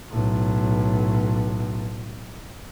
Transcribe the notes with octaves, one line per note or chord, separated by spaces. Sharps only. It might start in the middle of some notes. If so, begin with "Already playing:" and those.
B1 A2